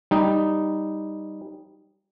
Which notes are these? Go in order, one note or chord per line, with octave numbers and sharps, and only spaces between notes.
G3 D#4